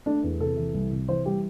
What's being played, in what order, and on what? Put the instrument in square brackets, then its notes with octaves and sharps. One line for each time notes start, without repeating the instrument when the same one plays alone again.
[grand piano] A3 D4
E2
C3 A4
E3
C2
C3
E3 C5
G3 G4